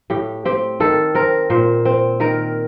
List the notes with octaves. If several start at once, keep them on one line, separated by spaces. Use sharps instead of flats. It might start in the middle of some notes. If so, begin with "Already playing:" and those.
A2 G4
C4 G4
D#3 A4
C4 A#4
A#2 C5
C4
D#3 A#4